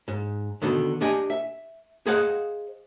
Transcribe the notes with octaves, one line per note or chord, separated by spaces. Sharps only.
G#2
B2 D3 D#3
D4 G4 D#5 G#5
E5
G#4 C5 D#5 F5 F#5